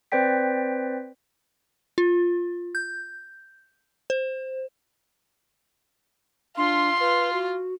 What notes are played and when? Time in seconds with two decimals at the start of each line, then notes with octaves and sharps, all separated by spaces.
0.12 C4 B4 C5 D5 G5 B6
1.98 F4
2.75 G6
4.10 C5
6.57 D4 F4 C6
7.00 F4 B4
7.33 F#4